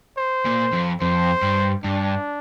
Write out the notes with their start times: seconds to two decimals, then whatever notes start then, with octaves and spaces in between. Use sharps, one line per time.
0.17 C5
0.46 A#2
0.73 F2
1.01 F2 C5
1.42 G2
1.84 G2 D4